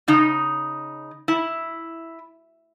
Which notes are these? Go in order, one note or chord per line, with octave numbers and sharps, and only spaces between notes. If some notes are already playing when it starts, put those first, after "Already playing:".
C#3 D#4
E4